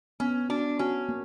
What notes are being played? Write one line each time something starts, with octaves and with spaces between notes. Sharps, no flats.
B3 C#4
D4 F#4
C#4 F#4
A#3